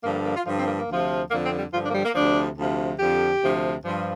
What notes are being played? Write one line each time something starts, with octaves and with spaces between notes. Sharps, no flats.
G2 D3 F3 A#3
A#3
A#3
F4
G2 D3 F3 F4
C4
A#3
A#3
D2 C3 F3
F2 D3 F3 A#3
C4
G3
G2 D3 F3 F4
D4
A#3
G3
A#3
D2 C3 F3 D4
D2 C3 F3
F2 D3 F3 G4
D2 C3 F3
G2 F3